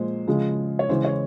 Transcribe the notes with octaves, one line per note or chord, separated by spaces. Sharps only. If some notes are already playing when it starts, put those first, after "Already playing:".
Already playing: A#2 F3 G#3 C5
C#3 F3 G#3
C#5
C#3 E3 G#3 C5
C#5